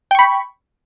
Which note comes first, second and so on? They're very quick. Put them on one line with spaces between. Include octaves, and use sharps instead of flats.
G5 C#6 B5